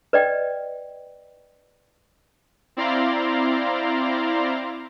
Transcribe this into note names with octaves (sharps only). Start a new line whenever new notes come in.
B4 D5 D#5 G5
C4 E4 D5 F5 A#5 C6